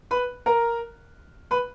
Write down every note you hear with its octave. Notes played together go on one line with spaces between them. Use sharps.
B4 B5
A#4 A#5
B4 B5